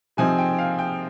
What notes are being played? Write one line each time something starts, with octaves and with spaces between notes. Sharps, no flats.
C3 F3 C4 D#4 G#5
G5
F5
G5